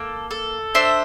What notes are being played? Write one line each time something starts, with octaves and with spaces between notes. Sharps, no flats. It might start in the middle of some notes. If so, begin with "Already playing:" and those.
Already playing: A#3 A4
A4
D4 C5 E5